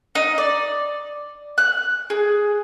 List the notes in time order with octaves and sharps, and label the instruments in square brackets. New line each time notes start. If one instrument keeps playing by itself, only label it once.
[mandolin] D#4
D5
F#6
G#4